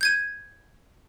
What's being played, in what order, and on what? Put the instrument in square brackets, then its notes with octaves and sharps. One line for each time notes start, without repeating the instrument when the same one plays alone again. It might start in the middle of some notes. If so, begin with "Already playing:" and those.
[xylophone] G6 G#6 D#7